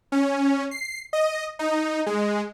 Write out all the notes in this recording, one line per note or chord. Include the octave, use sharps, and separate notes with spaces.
C#4
C7
D#5
D#4
G#3